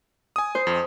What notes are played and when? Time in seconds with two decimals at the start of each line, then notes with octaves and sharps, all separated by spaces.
0.36 G#5 D#6
0.55 C5
0.67 F2